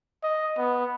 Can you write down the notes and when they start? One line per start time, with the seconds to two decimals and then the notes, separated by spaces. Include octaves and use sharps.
0.23 D#5
0.58 B3